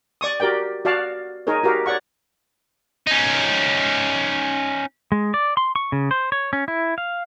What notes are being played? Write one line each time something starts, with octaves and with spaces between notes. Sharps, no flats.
D5 C#6 D#6
F#4 G4 A#4 D5 G5
F#4 D5 F5 A5
D#4 G#4 A#4 C#5
F#4 G4 A#4 F5
C#5 D5 F#5 C#6
C#4 D#4
G#3
D5
C6
C#6
C#3
C5
C#5
C#4
E4
F5